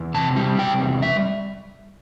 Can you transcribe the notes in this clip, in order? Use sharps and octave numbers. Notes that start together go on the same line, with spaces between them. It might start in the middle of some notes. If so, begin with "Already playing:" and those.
Already playing: E2
C3 A5
G3
C3 G5
E2
G3 E5